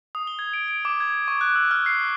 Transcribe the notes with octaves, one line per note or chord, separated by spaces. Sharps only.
D#6
G7
G#6
D7
D7
D6
G#6
C#6
F#6
E6
F6
C7